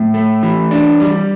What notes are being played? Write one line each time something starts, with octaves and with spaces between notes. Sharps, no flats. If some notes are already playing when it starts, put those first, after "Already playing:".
Already playing: A2
A3
E3
D4
G3